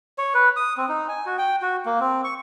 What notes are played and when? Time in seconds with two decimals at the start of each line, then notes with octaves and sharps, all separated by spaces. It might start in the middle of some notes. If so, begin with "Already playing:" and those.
0.18 C#5
0.34 B4
0.56 D#6
0.77 C4
0.89 D#4
1.08 G#5
1.26 F#4
1.38 G5
1.62 F#4
1.86 A#3
2.00 C4
2.24 C#6